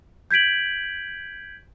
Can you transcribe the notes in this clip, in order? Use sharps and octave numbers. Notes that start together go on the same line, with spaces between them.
G6 G#6 B6 D7 F#7